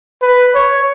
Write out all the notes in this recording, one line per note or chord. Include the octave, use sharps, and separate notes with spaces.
B4
C#5